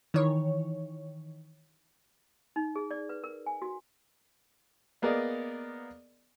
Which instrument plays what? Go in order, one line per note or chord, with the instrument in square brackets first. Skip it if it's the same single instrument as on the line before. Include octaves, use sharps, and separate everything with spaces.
[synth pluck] D#3 E3 C#5
[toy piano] D#4
G#4
D5
B4
A#4
G#5
F#4
[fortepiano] A#3 B3 G#4 A#4 D5 D#5